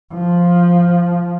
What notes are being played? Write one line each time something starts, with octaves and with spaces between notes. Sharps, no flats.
F3